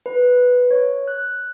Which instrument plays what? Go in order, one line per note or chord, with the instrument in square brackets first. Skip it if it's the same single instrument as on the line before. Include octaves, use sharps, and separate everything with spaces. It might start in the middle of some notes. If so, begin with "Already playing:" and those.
[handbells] B4
C#5
F#6